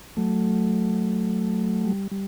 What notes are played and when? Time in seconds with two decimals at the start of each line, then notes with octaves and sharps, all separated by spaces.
0.17 F#3 A3
1.84 G3
2.11 G3